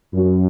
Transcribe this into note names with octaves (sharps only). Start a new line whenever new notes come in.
F#2